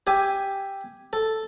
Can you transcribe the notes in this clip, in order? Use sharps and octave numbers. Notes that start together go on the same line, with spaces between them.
G4 E5 G#5
A4